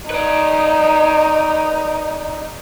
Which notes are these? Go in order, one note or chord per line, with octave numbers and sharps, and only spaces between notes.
D#4 B4 D5